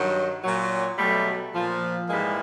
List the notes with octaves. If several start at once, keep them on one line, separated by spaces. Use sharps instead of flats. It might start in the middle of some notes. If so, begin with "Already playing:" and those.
Already playing: G2 D#3 F#3
A#2 F#3
B2 F#3 G3 A3
A#2 F3
G#2 E3 G3 G#3 A#3